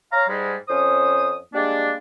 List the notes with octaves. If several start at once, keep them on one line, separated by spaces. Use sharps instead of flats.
C#5 F5 A#5
G#2 G3 G#3
F2 C#4 C5 D#6
G3 G#3 A#3 D4